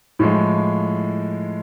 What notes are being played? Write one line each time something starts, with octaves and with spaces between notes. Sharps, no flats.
A2 F3 G#3